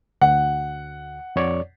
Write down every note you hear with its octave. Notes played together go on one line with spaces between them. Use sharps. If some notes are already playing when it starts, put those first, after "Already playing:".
D2 F#5
F2 C#5 D5